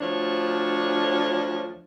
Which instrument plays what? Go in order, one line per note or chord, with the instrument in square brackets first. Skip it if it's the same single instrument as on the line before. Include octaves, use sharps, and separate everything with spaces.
[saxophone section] D2 F3 D4 C#5